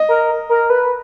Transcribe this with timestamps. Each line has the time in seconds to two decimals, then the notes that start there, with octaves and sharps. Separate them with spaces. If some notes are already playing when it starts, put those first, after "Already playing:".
Already playing: D#5
0.09 A#4
0.49 A#4
0.70 B4